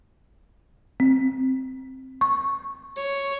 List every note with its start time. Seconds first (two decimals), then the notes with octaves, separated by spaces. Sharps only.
1.00 C4
2.21 C#6
2.96 C#5